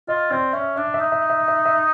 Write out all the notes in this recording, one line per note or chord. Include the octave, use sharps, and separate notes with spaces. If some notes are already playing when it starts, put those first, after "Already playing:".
F4 D#5
C4 D5
C#4 E5
D4 E5
E5
D#4
E5
E5
E5
E5